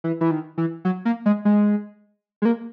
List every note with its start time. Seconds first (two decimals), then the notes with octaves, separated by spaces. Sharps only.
0.04 E3
0.21 E3
0.31 D#3
0.58 E3
0.85 F#3
1.05 A#3
1.26 G#3
1.45 G#3
2.42 G#3
2.45 A#3